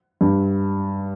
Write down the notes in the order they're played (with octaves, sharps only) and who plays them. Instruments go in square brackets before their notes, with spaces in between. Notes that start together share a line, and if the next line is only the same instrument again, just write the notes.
[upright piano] G2